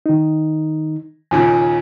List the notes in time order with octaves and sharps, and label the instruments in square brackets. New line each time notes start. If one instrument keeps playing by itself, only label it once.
[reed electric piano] D#3 D#4
[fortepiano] D#2 A#2 C#3 [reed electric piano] G#5